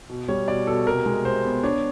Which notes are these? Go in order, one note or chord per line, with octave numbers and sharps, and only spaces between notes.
B2
G3 C#5
B2 D5
B2 A4
C3 A#4
G#3
C3 C5
B3
D4 C#5